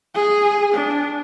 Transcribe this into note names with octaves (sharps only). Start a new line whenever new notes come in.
G#4
D4